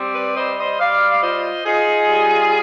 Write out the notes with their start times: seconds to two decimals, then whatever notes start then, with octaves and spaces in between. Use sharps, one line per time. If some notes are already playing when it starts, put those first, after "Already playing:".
Already playing: G3 C4
0.14 B4 D5
0.36 G3 C5 D#5
0.58 C5 D#5
0.79 G3 D5 F5
1.10 F5
1.23 F4 C5 D#5
1.65 D#4 F4 G#4
2.08 G3